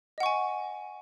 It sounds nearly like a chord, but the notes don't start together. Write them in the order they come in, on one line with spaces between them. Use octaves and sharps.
D#5 F#5 C#6 G#5